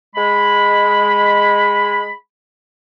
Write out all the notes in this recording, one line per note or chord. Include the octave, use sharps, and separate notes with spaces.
G#3 B5